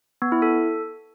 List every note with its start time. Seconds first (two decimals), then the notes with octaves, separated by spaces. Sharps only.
0.22 B3
0.32 E4
0.42 A4